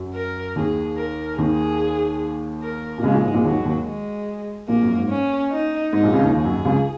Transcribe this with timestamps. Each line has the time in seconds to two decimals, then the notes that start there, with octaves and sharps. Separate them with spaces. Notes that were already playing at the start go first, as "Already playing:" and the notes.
Already playing: F#2 F#3
0.15 A#4
0.56 D#2 D#3 G#4
0.97 A#4
1.38 D#2 D#3 G#4
2.62 A#4
2.98 A#2
3.03 C#2 C#3 G#3
3.13 A#1 A#2
3.24 G#2
3.34 A#1 A#2
3.44 D#2 D#3 F#3
3.65 D#2 D#3
3.86 G#3
4.68 A#1 A#2 A#3
4.82 F#2
4.96 G#2
5.10 C#4
5.51 D#4
5.92 G#2 D#4
6.03 A#1 A#2
6.13 C#2 C#3
6.23 D#2 D#3
6.34 D#2 D#3 G#4
6.44 F#2 F#3
6.65 C#2 C#3